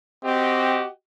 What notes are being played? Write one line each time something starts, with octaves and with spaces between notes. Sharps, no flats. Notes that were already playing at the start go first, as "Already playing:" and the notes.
C4 F#4 G4 D#5